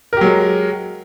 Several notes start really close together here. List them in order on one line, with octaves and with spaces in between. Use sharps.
A#4 G4 F#3 G#3